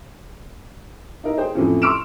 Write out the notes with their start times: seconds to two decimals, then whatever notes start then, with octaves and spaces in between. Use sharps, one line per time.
1.24 D#4 E4 A#4
1.38 G#4 C5 G5
1.55 F2 A2 E3 F3 C4 C#4
1.82 C6 C#6 E6 F6 D7 E7